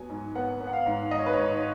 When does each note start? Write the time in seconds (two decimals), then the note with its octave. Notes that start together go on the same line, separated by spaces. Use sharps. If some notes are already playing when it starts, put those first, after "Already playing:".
Already playing: F#3 B3 G#5
0.09 G#2
0.35 B3 F#5
0.61 B3
0.67 F#5
0.73 F5
0.86 G#2
1.11 G#2 D#5
1.19 C#5
1.26 B4
1.33 G#2 C#5